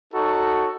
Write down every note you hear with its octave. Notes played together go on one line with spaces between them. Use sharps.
D#4 F#4 A4 C#5